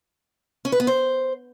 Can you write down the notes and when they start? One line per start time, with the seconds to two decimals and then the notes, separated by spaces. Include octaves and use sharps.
0.65 C#4
0.72 B4
0.80 B3
0.87 C5